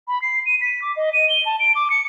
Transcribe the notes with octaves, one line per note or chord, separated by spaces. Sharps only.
B5
C7
D#7
B6
D6
D#5
D#7
G7
A5
D7
D6
C#7